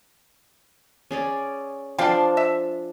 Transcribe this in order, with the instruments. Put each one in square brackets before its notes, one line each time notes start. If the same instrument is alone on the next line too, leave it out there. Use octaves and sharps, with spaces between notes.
[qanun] C#4 G#4 D5
[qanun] F3 D4 C6 [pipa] F5 G5
[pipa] E5